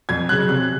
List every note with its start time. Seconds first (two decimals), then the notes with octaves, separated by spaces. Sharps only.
0.09 F2 G#6
0.29 F#3 F#6
0.32 C#3
0.49 C3 F#6